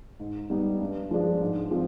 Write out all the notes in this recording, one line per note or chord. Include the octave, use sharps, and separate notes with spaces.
G#2
G3 B3 D#4
G2
F3 G#3 D4
G#2
F3 C4